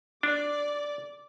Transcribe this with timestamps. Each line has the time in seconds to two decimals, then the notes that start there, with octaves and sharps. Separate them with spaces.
0.23 D4 D5 D6